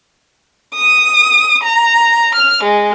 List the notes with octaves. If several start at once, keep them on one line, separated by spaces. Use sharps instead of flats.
D#6
A#5
F6
G#3